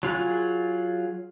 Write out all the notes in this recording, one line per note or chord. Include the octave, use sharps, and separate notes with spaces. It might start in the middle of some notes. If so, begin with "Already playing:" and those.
F#3 F4 G#4 F#6